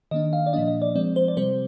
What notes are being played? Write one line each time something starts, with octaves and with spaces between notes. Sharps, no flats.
D#3 A#3 D4 D#5
F5
D5
A#2 F3 A#3 D4 D#5
D#5
D5
F3 G#3 C4 D5
C5
D5
C3 G3 C4 C5